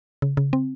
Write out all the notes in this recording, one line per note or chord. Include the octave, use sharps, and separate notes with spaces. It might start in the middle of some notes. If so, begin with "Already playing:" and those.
C#3
C#3
C4